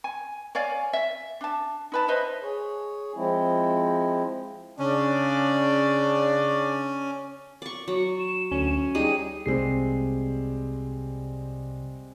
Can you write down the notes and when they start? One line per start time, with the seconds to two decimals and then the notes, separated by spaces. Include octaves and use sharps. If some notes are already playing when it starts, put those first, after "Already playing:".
0.04 G#5
0.55 C#5 D5 F5 G#5
0.93 E5
1.41 D4 A5
1.92 D#4 B4 A5
2.08 B4 C5 D#5 E5
2.43 G#4 C#5
3.16 F3 G#3 C4 E4
4.79 C#3 C#4 D4 D5
7.62 D5 C#6
7.88 F#3 C#6
8.19 E7
8.51 D2 C#4
8.95 G3 D#4 G#4 D#7
9.46 C2 C3 G3 G#3 C4 C7